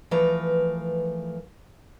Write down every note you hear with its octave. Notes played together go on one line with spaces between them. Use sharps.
E3 F3 A3 A#4 B4